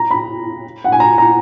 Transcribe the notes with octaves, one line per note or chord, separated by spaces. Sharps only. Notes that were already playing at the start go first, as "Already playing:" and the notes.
Already playing: A#5
B5
F#5
G#5
A#5
A#5